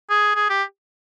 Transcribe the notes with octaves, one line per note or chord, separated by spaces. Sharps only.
G#4
G#4
G4